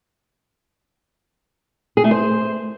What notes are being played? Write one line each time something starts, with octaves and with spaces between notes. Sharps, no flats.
G#4
A3
C5